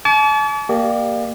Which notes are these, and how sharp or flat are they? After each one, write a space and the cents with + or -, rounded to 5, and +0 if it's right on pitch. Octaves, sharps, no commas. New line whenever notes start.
A5 -40 D6 -45
A#3 +0 G4 +0 D5 +40